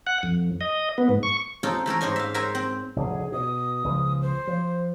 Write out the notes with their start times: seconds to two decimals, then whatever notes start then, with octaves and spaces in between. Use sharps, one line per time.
0.07 F#5
0.23 F2
0.61 D#5
0.98 B3
1.09 G#2
1.23 C#6
1.63 C4 D#4 F4 A4 C#5 D#5
1.86 E3 A3 A4 A#4
2.01 G#2 C5 C#5 D#5 G#5
2.16 E5 F5
2.34 A#4 C5 C#5 E5 G#5 A#5
2.55 C4
2.96 F1 D2 A2 G#4
3.32 B2 D#6
3.84 C#2 C#3 F3
4.22 C5
4.47 F3